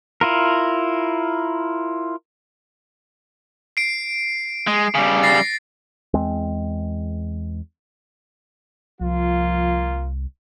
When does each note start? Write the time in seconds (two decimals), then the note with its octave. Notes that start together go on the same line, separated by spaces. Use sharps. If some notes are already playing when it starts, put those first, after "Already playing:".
0.21 E4 F4 A#4
3.77 C7 D7
4.67 G#3
4.95 C#3 G3
5.23 A6 A#6 C7
6.14 E2 G#3 C4
9.01 C2 F3 A#3 F4